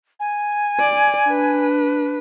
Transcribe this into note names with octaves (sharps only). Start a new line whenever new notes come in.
G#5
D5
D4 B4